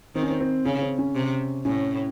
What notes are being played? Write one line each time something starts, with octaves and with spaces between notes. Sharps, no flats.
D#3 C4
C#4
C4
C4
C#3 C#4
C4
C#4
C3
A2 C#4